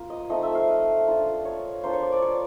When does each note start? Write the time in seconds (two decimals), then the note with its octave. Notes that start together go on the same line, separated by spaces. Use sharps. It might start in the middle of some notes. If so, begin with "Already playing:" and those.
Already playing: A#3 F4
0.10 D#5
0.29 F3 A3 C4 D#4 D#5
0.43 E5
0.55 F5
0.68 D#5
1.07 A#3 D4 F4
1.45 C#5
1.83 A#3 D4 F4 C5
1.93 C#5
2.02 D5
2.12 D5
2.22 C#5